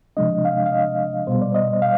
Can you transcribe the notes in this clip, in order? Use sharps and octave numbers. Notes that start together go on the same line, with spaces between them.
C3 F3 G#3 D4 D#5
F5
F5
D#5
B2 G3 B3 C5
D5
D#5
F5